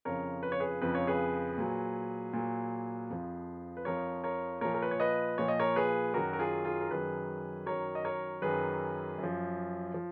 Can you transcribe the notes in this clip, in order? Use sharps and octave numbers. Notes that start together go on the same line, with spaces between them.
F2 C#3 F3 A#4 C#5
B4
C#5
G#4 B4
F2 C#3 F3 B4
C#5
G#4 B4
A#2 F#3
A#2 F#3
F2 F3
B4
F2 F3 A#4 C#5
A#4 C#5
A#2 F3 A#4 C#5
A#4
B4
C#5
B4 D#5
A#2 F3 C#5
D#5
A#4 C#5
G#4 B4
F#2 D#3 F#3 F#4 A#4
A#4
F4 G#4
F4 G#4
A#4
F#2 D#3 F#3 G#4 B4
F#2 D#3 F#3 A#4 C#5
D#5
A#4 C#5
F#2 D#3 F#3 G#4 B4
F#2
F3
F3